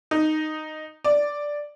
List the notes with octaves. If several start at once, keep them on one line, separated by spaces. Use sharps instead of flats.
D#4
D5